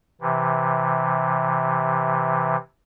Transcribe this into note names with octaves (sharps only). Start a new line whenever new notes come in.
C3 E3